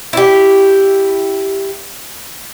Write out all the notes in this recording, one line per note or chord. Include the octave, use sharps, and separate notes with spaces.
E4 G4